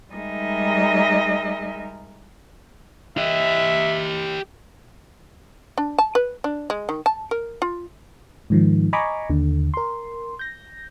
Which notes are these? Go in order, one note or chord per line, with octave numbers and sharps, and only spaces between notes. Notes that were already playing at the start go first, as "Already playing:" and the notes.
G3 G#3 D#4 A#4 D#5 E5
G4 D#5 E5
D4
A5
B4
D4
G#3
D#3
A5
A#4
F4
G#2 D#3 F3
D#5 G#5 A#5 B5 C#6 D6
D#2 D3
A#4 C6
G6 A#6